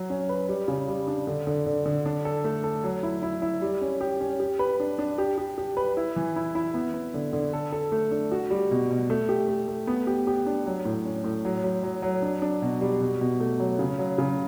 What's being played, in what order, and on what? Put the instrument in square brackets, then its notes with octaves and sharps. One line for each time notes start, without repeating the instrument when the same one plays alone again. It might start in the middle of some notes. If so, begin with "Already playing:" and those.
Already playing: [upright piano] F#3
C#4
B4
G3
C#3
G3
D4
D3
D3
D3
D3
D4
A4
A3
A4
F#3
E4
E4
E4
G3
C#4
G4
C#4
G4
B4
D4
D4
G4
G4
G4
B4
E4
E3
E4
E4
B3
B3
D3
D3
A4
A4
A3
D4
F#4
G3
B2
B2
A3
G4
A3
A3
B3
G4
G4
D4
F#3
A2
C#4
A2
F#3
F#3
F#3
F#3
D4
D4
B2
G3
B2
B2
A3
F#3
C#3
F#3
C#3